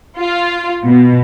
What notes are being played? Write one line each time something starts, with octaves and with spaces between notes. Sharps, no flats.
F4
B2